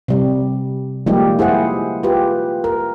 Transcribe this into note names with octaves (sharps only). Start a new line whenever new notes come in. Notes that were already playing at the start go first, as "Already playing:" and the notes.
C3 G3
F3 G3 G#3 A#3 D#4 G4
E4 G#4 C5 F#5
F4 G4 B4
A#4